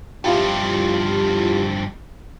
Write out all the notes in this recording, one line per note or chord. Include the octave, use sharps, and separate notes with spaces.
G2 F3 E4 F4 G4